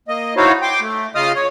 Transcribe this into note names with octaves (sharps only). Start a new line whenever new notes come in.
A#3 D#5
D#4 E4 F#4 C5 C#5 F5
G5 C6 D6
A3
C#3 F4 D#5 F5 D#6 F6
C#5